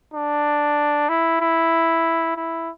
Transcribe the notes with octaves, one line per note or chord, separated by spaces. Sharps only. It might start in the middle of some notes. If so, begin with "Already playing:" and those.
D4
E4
E4
E4